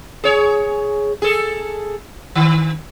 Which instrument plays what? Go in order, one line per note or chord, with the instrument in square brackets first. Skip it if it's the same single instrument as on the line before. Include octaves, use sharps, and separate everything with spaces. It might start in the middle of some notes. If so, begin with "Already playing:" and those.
[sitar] G#4 C#5
G#4 A4
D#3